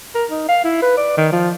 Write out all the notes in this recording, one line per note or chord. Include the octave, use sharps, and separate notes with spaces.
A#4
D#4
F5
E4
B4
D5
D#3
F3